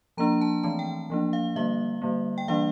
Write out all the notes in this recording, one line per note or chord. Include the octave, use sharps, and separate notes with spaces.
F3 A#3 D4 A#5
A5
E3 A3 C4 A5
G5
F3 A#3 D4
F5
D3 G3 A#3 E5
D3 G3 A#3
G5
E3 G3 A#3 D4 F5